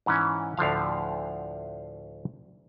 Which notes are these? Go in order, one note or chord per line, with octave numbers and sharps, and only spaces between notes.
G#2 E3 C#4
D2 A2 D3 F3 F5